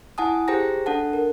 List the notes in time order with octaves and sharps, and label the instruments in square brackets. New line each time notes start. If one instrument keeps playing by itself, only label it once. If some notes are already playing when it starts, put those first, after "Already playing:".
[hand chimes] E4 F#5 G#5 A5 D#6
G4 G#4 C5 G5 A#5 A#6
D4 A4 F#5 A5
A#4